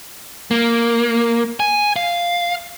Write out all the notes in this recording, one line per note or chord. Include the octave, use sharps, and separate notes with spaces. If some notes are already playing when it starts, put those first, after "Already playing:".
A#3
G#5
F5